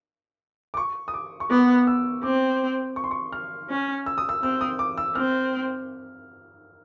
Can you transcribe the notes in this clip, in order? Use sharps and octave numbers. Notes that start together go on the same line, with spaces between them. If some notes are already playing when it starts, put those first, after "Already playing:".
D6
C#6
D#6
D6
C#6
B3 D6
E6
C4 D6
C#6
C6
C#6
F6
C#4
E6
D#6
E6
C4 E6
D#6
D6
E6
C4 F6